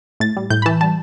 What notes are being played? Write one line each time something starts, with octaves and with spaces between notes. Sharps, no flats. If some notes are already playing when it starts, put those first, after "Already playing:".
A2 A6
G3
A2 G6
B5
E3 A5
G3 A5